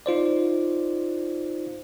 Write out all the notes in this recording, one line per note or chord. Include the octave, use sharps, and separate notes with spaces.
D#4 F4 C5 D5